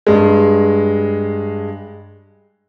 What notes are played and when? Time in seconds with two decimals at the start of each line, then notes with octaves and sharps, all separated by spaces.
0.07 G2 G#3